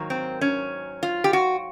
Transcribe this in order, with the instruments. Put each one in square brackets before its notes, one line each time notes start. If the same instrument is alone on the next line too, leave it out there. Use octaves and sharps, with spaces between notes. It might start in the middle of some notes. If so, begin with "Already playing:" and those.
Already playing: [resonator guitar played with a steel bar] G#2 D#3 F#3 A#3
C4
C#4
F4
G4
F#4